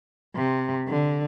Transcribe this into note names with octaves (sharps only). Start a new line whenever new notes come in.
C3
D3